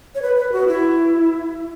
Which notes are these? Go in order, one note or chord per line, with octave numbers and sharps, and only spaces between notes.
C#5
B4
B4
F#4
E4